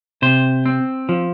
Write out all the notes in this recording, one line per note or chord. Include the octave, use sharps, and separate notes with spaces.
C3 C5
C4
F3